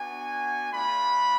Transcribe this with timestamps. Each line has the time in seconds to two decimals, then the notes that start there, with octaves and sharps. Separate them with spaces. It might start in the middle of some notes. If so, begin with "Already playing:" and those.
Already playing: B3 D4 F#4 G#5
0.72 A3 D4 F4 B5